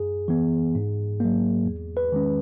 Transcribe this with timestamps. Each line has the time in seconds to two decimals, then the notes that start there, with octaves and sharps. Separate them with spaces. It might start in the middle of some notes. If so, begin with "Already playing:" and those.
Already playing: F#2 G#4
0.28 E3 B3
0.75 G#2
1.20 F#3 A#3
1.66 E2
1.97 B4
2.12 D#3 G#3 C#4